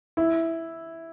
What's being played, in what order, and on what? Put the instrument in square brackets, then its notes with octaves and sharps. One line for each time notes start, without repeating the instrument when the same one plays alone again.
[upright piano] E4